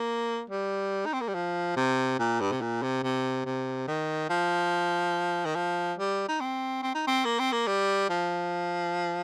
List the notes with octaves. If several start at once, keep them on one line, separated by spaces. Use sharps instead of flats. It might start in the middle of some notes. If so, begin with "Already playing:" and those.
Already playing: A#3
G3
D#4
C4
A#3
G3
F3
C3
A#2
G2
C3
A#2
C3
C3
C3
D#3
F3
D#3
F3
G3
D#4
C4
C4
D#4
C4
A#3
C4
A#3
G3
F3